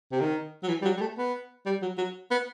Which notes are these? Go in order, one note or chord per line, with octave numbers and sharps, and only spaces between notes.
C3
D#3
F#3
E3
G3
F#3
G3
A3
B3
G3
F#3
F#3
B3